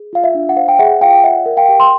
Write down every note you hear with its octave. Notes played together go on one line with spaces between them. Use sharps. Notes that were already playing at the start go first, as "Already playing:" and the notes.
Already playing: G#4
F4 F5
E5
D4
F#5
C5 F5
G5
G#4 E5 F#5
F4 F5 G5
D5 E5 F#5
A#4
F5 G5
G4
C6